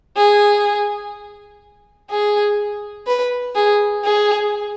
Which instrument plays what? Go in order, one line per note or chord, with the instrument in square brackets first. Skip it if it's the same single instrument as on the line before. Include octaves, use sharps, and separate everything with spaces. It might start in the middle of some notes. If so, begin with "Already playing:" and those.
[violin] G#4
G#4
B4
G#4
G#4